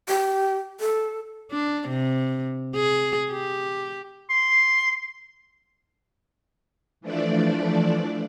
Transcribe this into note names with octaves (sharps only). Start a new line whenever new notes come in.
G4
A4
D4
C3
G#4
G4
C6
E3 F3 A3 D4 D5